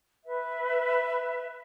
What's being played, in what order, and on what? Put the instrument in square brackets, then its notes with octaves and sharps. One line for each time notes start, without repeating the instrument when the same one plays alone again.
[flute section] B4 E5